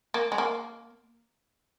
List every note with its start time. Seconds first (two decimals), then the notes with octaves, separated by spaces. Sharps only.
0.14 A#3
0.32 G#3
0.38 A#3